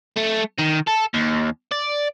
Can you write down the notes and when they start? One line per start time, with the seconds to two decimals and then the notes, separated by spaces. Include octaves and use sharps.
0.17 A3
0.59 D#3
0.88 A4
1.14 D#2
1.72 D5